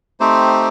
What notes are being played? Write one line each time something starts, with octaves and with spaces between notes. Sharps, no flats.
A3 C4 D#4 G4 C5